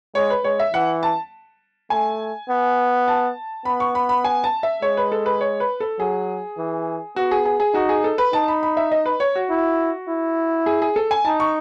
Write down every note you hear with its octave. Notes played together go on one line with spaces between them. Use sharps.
G#3 C#5
B4
G#3 C#5
E5
E3 F#5
A5
A3 G#5
B3
A5
B3 B5
C#6
B5
B5
G#5
A5
E5
G#3 C#5
B4
A4
B4
C#5
B4
A4
F#3 G#4
E3
B3 F#4
G#4
G#4
G#4
D#4 F#4
G#4
A4
B4
D#4 A5
B5
B5
E5
D#5
B4
C#5
F#4
E4
E4
G#4
G#4
A4
G#5
D#4 A5
C#6